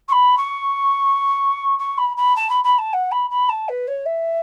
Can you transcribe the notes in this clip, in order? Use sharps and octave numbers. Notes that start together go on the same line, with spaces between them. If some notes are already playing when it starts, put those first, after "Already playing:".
C#6
B5
C#6
C#6
B5
B5
A5
B5
B5
A5
F#5
B5
B5
A5
B4
C#5
E5